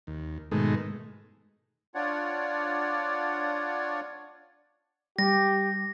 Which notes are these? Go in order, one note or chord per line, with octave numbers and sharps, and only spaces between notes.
D#2
G#2 B2 D#3 G#3 A3
D4 F4 C#5 D5 F#5
G3 G4 A#6